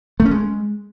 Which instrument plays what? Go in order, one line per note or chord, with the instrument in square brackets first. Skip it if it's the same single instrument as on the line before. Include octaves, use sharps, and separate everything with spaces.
[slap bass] A3
C#4
G#3